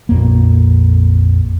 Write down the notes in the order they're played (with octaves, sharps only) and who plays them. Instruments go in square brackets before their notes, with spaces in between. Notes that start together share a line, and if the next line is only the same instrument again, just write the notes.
[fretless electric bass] A#1 F2 A#3